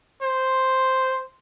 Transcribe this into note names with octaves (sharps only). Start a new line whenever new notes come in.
C5